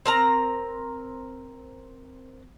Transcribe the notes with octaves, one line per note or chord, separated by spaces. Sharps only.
C4 A#4 A#5